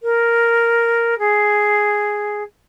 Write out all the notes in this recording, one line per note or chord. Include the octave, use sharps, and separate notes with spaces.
A#4
G#4